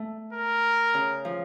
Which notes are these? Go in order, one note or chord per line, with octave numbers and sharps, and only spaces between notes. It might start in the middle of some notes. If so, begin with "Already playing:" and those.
Already playing: A3
A#4
C#3
F3